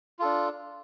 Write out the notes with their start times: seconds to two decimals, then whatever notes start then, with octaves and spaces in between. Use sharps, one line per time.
0.19 F4
0.22 A4
0.24 D4